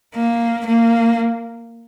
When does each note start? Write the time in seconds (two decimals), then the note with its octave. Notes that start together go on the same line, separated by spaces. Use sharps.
0.15 A#3
0.66 A#3